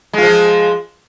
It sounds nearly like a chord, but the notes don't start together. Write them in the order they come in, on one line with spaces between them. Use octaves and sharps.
G#3 F4 F3